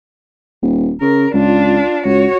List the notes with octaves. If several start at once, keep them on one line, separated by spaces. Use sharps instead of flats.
D#1
C#3 A#4
C#2 D4 F4
C#2 F#4 C#5